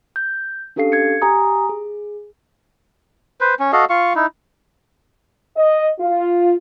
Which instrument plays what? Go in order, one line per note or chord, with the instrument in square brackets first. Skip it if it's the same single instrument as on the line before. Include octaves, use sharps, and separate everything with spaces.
[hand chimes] G6
C#4 D4 G4 A4 F5 C7
G#6 C#7
G4 G#5 A#5 D#6
G#4
[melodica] B4 C5
C#4
F#4 A4 D#5 F5
F4 F5 C#6
D#4 E4
[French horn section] D#5
F4